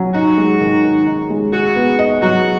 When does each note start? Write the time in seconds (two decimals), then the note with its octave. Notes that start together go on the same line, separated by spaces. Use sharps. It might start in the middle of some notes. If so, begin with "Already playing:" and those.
Already playing: F#3 C#4
0.14 D#4 F#4
0.38 G#3
0.61 D#3
0.83 D#3
1.07 D#4
1.30 G#3
1.53 F#4 G#4
1.76 B3
1.99 D#5
2.22 F#3 F#4